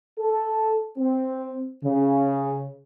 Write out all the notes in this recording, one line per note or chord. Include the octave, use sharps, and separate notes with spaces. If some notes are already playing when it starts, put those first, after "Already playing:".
A4
C4
C#3